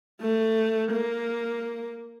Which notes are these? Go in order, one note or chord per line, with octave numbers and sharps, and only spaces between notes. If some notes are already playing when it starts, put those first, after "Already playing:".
A3
A#3